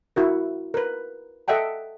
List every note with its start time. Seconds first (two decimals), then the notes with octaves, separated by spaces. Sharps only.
0.16 E4 F#4 A#4
0.74 A#4 B4
1.48 A4 D#5 E5 F#5 G5 A5